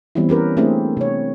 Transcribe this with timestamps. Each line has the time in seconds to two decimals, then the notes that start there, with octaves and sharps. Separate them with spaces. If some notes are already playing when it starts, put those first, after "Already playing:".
0.15 E3 G3 B3 C4 E4
0.29 C#4 G4 A#4 B4
0.57 A3 A#3 C4 D4 E4 G#4
0.97 C3 C#5